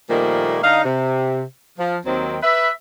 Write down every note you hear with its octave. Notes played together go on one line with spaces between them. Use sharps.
A#2 D#3 F3 G3 A3 A#3
D3 D#4 F5
C3
F3
D#2 D#3 F#3 C4
B4 E5